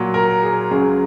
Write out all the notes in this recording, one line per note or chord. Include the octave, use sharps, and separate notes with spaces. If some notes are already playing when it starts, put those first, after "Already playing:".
Already playing: A#2 F#3
A#4
G#4
C#2 C#3 F#3 G#4